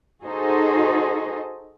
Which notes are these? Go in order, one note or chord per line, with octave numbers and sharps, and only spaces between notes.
D#4 F#4 G#4 A4 C5 D#5